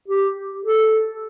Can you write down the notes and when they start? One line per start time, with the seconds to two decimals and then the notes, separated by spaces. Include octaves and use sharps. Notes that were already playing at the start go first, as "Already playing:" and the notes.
0.08 G4
0.65 A4